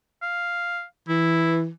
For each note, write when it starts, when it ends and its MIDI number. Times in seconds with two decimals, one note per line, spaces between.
0.22 0.83 77
1.08 1.68 52
1.08 1.58 64